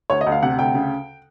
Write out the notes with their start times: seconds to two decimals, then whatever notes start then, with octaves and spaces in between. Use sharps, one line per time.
0.10 D2 C#5
0.21 D#5
0.27 D2
0.32 F5
0.42 C3 F#5
0.59 D2 G5
0.75 C#3